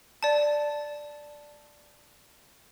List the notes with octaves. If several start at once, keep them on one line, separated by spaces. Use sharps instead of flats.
D5 A5